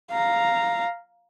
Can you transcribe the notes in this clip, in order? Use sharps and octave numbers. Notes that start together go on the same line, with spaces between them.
F5 A#5